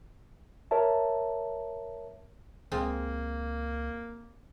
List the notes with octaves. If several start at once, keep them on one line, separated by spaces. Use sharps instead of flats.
A#4 C#5 E5 A5
C#2 G#3 A#3 C4 F4